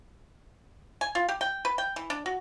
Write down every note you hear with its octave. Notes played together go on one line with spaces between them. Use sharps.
G#5
F4
G4
G5
B4
G5
E3
D4
F#4